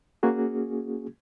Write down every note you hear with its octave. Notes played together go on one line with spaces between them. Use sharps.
A#3 C#4 F#4 G#4